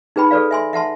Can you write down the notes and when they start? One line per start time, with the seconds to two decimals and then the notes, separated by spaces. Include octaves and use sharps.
0.16 D#4 G#4 B4 G5 B5
0.31 G#4 A4 B4 D5 F5
0.51 E5 G#5 C6
0.73 E5 F#5 A5 C6